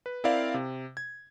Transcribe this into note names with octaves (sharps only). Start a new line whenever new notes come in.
B4
C4 E4 A#4 C5 D5 F5
C3
G#6